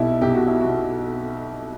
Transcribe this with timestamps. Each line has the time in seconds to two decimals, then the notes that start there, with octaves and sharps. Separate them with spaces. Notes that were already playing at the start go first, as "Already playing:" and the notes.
Already playing: B1 B2 E4 G4 A4
0.21 B1 G4
0.35 F#4
0.47 E4
0.61 B2 F#4